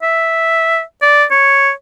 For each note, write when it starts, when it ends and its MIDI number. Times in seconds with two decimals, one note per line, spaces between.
0.02 0.81 76
1.02 1.24 74
1.31 1.71 73